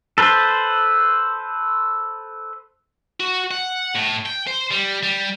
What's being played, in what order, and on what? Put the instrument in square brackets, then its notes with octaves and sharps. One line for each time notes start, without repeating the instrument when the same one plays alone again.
[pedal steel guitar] A4 B4 C5
[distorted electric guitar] F#4
F#5
A2
G5
C5
G3
G3